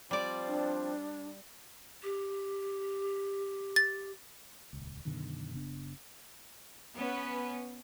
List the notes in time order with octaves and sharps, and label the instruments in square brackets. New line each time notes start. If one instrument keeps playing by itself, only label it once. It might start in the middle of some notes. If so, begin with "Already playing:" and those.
[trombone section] F3 C4 [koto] G3 D5
[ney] D4
[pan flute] G4
[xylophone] A6
[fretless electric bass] D#1 C#2
F#2 B2 D3 D#3
F#1 C#3 B3 D4
[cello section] B3 C#4 B4